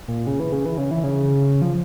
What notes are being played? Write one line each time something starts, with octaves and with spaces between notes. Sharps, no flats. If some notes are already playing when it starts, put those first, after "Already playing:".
A#2
C#3
E3
C#3
E3
C#3
E3
C#3
F3